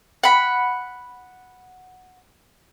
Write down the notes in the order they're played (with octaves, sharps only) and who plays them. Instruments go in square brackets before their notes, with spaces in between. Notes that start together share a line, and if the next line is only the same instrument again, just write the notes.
[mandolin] F#5 B5